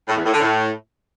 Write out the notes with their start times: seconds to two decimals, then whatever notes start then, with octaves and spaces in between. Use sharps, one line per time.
0.08 A2
0.16 E2
0.25 A2
0.33 D3
0.41 A2